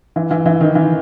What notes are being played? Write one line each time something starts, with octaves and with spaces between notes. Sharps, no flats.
E3
E3
E3
D#3
E3